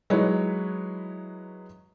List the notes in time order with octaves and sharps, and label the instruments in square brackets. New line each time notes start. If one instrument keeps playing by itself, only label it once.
[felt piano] F#3 G#3 D#4 E4 B4 C#5